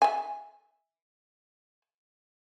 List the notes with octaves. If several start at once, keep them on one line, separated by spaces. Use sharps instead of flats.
E5 G#5